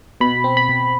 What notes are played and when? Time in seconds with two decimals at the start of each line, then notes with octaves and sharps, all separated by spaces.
0.21 B2 B5
0.44 C4
0.57 B5
0.69 B2